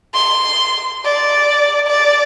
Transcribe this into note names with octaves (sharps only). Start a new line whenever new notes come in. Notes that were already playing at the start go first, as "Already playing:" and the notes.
C6
D5
D5